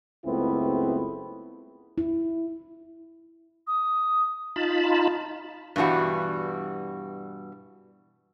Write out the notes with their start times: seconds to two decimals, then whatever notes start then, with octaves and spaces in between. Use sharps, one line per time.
0.25 F#1 C#2 A3 B3 C4 E4
1.98 E4
3.67 D#6
4.56 D#4 F4 A5 B5
5.76 G2 B2 E3 G3 F#4